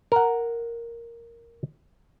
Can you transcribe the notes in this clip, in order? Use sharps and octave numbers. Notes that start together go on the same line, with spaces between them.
A#4 F#5